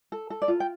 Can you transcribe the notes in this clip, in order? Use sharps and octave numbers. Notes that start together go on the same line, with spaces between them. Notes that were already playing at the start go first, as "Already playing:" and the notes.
A4
A4
D5
F4
G5